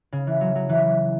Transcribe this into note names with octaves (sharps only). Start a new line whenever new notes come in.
C#3
E3
F#3
F#3
E3